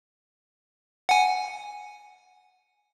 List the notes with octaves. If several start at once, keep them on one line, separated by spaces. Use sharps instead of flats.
F#5 G#5